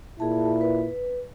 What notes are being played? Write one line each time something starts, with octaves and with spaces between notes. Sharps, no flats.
A#2 E4 G#4 A5
B4